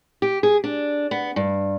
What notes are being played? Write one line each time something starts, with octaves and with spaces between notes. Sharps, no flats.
G4
G#4
D4
B3
G2